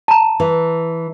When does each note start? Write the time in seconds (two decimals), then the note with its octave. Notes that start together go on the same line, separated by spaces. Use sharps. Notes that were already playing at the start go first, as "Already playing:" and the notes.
0.08 A5 A#5
0.40 E3